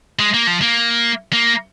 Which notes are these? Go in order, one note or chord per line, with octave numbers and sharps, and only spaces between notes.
G#3
A#3
F3
A#3
A#3